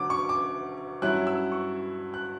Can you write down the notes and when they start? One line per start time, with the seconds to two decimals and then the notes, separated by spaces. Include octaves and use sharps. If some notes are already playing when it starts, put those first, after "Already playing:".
Already playing: D2 D3 F#3 D6
0.10 C#6
0.29 D6
1.02 G2 F#3 C#4 E4 F#6
1.27 E6
1.52 C#6
2.14 F#6